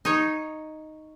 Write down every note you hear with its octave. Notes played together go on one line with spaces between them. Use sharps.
D#4 C#5